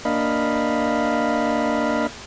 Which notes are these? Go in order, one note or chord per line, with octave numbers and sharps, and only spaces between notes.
A#3 D4 D#5 F5 B5